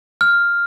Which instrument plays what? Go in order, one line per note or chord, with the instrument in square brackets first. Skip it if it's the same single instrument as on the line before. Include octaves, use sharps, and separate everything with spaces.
[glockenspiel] F6